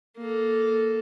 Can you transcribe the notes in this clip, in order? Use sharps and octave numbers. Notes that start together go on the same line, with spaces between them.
A#3 A4